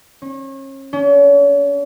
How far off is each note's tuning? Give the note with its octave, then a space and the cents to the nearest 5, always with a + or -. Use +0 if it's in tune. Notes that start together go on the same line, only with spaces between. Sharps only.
C#4 -35
C#4 +40